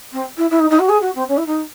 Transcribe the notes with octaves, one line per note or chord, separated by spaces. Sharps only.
C4
E4
E4
D#4
D#4
F#4
G#4
F#4
C4
C#4
E4
D#4